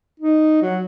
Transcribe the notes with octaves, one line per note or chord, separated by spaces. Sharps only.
D#4
F#3